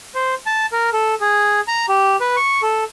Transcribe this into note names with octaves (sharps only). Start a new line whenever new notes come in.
C5
A5
A#4
A4
G#4
A#5
G4
B4
C#6
A4